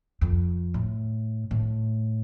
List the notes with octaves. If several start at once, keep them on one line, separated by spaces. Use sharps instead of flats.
F2
A2
A2